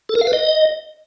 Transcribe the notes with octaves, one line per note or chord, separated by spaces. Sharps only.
A4
A#4
F5
B4
D#5